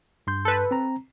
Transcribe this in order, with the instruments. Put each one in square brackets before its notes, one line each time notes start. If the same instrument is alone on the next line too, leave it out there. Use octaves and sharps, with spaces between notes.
[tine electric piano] G2 C6 G6
[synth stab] A4 B4
[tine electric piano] C4 A#5